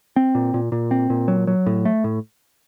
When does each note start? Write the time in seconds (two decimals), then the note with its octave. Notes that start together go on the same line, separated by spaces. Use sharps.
0.16 C4
0.35 A#2
0.54 A#2
0.72 A#2
0.91 C4
1.10 A#2
1.28 F#3
1.47 F#3
1.66 A2
1.85 A3
2.04 A2